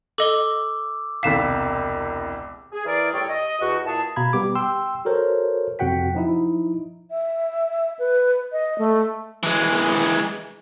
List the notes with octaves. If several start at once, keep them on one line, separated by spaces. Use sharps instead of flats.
A4 D#5 D6 E6 G7
E1 C2 F5 B6 E7
G#4
E3 E4 G#4 A#4 D5
A2 G3 A4 C#5 G5
D#5
E2 F#4
A#2 E4 G#4 A5
B2 F5 A#5 B5 G#6
G3 B3 G4 D6
G5 C6 E6
F#4 A4 A#4 C5 C#5
F2 C3 F#4 F#5 G5 B6
F3 D#4 E4
E5
B4
D#5
A3
E3 G#3